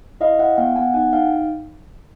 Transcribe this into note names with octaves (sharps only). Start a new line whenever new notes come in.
E4 D#5 F5
E4 E5 F#5
B3 F5 G5
B3 F#5 G#5
D#4 F#5 G#5
D#4 F5 G5